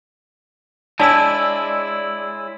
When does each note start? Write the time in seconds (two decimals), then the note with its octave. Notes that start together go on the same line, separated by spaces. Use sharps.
1.00 G#3 D4 E4 C#5 D5 A5 E6